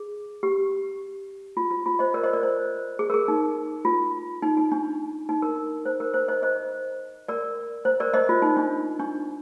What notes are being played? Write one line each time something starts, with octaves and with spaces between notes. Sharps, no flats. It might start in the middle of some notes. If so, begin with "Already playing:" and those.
Already playing: G#4
G4
F4
F4
F4
C5 D#5
A#4 D5
C5 D#5
A#4 D5
C5
G#4
A#4
G#4
D#4
F4
D#4
D#4
D4
D#4
A#4
C5
A#4
C5
C5 D#5
C5 D#5
A#4 D5
C5
A#4 D5
C5 D#5
F4
D#4
D4
D4